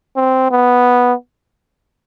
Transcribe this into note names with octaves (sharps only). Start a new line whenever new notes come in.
C4
B3